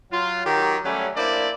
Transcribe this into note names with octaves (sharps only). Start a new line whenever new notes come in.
F#3 F4
D#3 F#3 G4
F#3 G3 A3 C#4
A#3 D4 E4 C5 D5